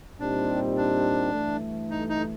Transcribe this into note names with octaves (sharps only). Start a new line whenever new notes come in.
A#2 G3 C4 D4 D#4 G4
D4
G2 E3 A3
D#4
D#4